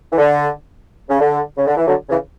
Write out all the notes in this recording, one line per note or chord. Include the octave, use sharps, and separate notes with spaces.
E3
D3
C#3
D3
C#3
D3
E3
D3 F#3
C#3 E3